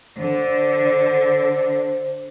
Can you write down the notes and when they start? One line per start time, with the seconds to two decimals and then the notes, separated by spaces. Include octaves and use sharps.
0.18 D3 C5